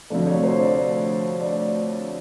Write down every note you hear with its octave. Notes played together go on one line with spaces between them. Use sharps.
D2 C3 F3 A3 D5
C#5
C5
D5
D5